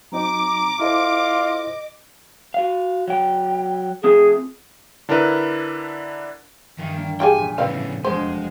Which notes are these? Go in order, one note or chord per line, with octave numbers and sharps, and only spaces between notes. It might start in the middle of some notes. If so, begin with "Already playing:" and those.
F#3 C4 D#4 A#5 D6
E4 F4 A4 C5 D#5
F#4 F5
F#3 G5
A3 C4 F4 G#4
D3 D4 E4 A#4 B4
G2 D#3 E3 G3
G3 A#3 D4
F4 G4 G#4 G5 G#5
F1 A#2 A3
A2 C#3 C4 B4 F5
E1 F2 G#3 C4 C5